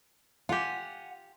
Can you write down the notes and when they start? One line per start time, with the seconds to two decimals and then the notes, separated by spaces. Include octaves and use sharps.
0.49 F4 G4 F#5 G#5